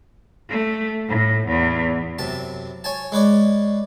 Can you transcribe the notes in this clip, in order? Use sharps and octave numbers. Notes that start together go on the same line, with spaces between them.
A3
A2
E2
F#2 C3 A5
C#5 G#5 A5
G#3 B4 C#5 D5